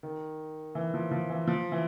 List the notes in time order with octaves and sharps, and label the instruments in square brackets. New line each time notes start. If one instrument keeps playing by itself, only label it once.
[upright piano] D#3
E3
F3
F3
E3
F3
E3